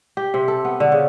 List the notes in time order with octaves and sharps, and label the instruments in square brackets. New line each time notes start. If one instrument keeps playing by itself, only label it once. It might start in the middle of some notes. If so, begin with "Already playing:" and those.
[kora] G4
C3
A4
B3
D3
C#3